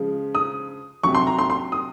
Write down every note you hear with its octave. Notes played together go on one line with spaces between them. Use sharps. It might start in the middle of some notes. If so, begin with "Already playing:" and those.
Already playing: C#3 F3 G#3
D#6
C3 F#3 C#6
C6
A#5
C6
C6
D#6